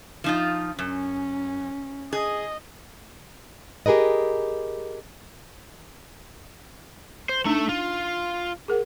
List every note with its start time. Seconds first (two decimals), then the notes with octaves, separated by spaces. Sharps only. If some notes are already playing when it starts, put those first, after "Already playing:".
0.24 F3 D#4 F4
0.79 F#2 C#4
2.13 G#4 D#5
3.86 G4 G#4 A#4 B4 D#5
7.29 C5
7.45 A3 D4 D#4 E5
7.69 F4
8.68 G#4 A#4 F#5